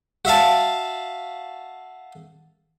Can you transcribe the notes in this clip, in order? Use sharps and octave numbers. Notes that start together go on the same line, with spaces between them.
F#4 E5 F5 A5